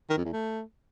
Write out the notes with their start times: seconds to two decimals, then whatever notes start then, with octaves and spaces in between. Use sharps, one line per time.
0.10 D#3
0.17 F2
0.25 E2
0.32 A3